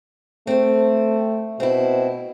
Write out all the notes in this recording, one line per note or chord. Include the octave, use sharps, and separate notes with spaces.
A3 C4 C5
B2 C4 E4